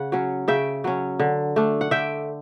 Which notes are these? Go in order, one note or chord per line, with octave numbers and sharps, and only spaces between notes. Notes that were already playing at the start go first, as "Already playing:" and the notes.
Already playing: C#3 F#5
F#3 C#4
C#3 E5 G5
F#3 C#4
D3
A3 D4
F#5
D3 E5 G5